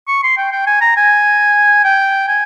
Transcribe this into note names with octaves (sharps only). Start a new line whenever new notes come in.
C#6
C6
G5
G5
G#5
A#5
G#5
G5
G#5